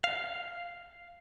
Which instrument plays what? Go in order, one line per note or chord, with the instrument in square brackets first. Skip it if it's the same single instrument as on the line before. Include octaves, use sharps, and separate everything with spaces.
[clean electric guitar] F5